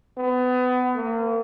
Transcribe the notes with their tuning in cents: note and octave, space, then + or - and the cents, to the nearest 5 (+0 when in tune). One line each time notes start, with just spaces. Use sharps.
B3 +30
A#3 -35